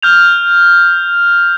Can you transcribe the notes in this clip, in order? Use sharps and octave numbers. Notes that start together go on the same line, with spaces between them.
F6 G6 F7